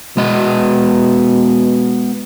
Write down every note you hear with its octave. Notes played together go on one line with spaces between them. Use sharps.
B2 G#3 B3 D#5